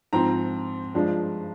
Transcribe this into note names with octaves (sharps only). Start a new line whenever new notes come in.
G#2 F3 C4 A#5
G2 F3 G#3 D4